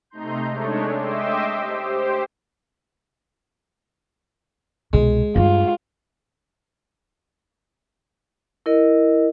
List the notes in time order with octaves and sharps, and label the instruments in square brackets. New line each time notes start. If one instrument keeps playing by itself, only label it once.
[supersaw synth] C3 A3 D#4 A#5 C6 G6
G#3 A3 D4 C#5
D#5 E5 G5 C6 D6 E6
G4 C5
[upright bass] C2 B2 [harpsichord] G#3
[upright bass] G2 G3 [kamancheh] F4
[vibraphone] E4 A#4 D#5